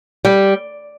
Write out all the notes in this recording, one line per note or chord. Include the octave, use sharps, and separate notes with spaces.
G3